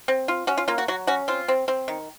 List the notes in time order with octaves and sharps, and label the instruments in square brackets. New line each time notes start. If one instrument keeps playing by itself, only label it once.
[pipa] C4
F4
C#4 F#4
F4
A#3 F4
F#4
F#3 F#4
C#4 F#4
C4 F4
C4
C4
D#3